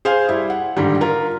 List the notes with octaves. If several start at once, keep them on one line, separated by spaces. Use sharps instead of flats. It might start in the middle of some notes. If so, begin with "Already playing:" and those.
G#4 C5 F5 G#5
G3 E4
F#5
G#2 D3 D#3 G3
F4 A#4